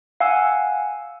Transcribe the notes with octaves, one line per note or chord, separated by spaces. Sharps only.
F5 F#5 G#5 E6